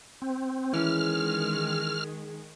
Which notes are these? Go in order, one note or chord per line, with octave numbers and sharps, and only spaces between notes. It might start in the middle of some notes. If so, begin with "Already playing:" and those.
C4
D#3 E3 G#3 C#4 F6